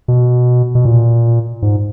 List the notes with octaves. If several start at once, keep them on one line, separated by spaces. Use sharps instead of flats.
B2
B2
A#2
G#2